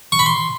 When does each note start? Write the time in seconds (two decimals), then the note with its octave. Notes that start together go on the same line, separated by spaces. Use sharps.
0.12 C#6
0.19 B5
0.26 C6